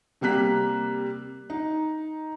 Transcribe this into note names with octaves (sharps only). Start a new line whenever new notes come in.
C3 G3 A#3 F#6 B6
D#4